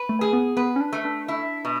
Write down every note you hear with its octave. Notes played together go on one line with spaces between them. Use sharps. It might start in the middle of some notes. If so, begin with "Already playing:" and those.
Already playing: B4
A3
G#4
B3
B3 B4
C#4
D4
A3
D4
E4
B2